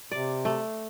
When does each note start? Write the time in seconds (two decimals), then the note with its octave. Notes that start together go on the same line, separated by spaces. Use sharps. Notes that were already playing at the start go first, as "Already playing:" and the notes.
0.11 C3 D5
0.45 A3